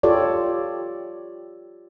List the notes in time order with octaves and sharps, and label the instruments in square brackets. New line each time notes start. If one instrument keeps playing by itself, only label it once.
[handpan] F4 G4 A4 C#5 D5